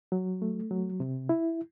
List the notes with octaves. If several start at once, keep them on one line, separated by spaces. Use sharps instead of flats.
F#3
A3
F#3
C3
E4